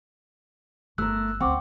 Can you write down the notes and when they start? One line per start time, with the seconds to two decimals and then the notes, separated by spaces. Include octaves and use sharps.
0.98 G1 A3 A#4 E6 F#6
1.41 D2 C4 C#4 F#5 G5 C#6 D6